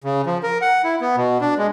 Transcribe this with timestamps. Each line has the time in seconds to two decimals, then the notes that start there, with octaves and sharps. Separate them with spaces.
0.04 C#3
0.26 F3
0.43 A#4
0.62 F#5
0.84 E4
1.01 B3
1.17 B2
1.41 D4
1.58 G#3